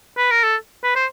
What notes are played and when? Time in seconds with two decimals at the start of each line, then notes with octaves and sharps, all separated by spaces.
0.17 B4
0.31 A#4
0.44 A4
0.84 B4
0.95 C5